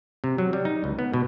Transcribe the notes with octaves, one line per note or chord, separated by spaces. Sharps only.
C3
F#3
G3
D#4
C#2
B3
B2